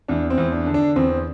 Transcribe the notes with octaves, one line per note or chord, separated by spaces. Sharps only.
E2 D4
C4
E2
D4
D3
D4
E2 C4